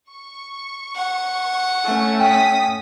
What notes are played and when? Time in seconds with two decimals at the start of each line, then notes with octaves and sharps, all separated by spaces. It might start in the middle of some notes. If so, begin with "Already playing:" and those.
0.10 C#6
0.95 F#5
1.84 A3 C#4
2.20 G5 D#6 B6